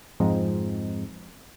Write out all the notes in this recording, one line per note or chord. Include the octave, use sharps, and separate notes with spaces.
F2 G#2 F3 G#3 C4 D#4